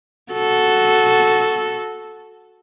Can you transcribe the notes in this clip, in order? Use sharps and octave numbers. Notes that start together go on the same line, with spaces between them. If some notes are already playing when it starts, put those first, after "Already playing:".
F#4 A4